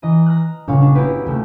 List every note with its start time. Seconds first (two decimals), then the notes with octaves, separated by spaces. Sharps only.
0.02 E3 D#5 A#5 D#7
0.26 A#5 F6 F#6
0.67 G1 A#2 C#3 C#5 F5
0.82 D4
0.95 A#3 B3 E4 F#4 G4 B4
1.25 D#1 C2 A3